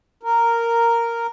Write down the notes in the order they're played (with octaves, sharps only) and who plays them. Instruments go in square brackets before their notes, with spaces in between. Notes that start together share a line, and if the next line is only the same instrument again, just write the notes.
[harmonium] A#4